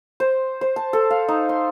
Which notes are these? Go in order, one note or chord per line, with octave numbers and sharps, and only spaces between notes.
C5
C5
A5
A4
F5
D#4
C6